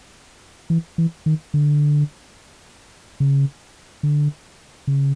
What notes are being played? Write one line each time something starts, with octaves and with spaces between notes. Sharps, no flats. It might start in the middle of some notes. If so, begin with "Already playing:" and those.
E3
E3
D#3
D3
C#3
D3
C#3